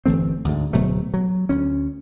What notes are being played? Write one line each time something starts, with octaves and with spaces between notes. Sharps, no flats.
G1 E3 A3 C4
D2 G#2
D1 B2 F#3 A3
F#3
D2 C#4